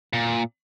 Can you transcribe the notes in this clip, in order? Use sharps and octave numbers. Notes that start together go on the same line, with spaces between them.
A#2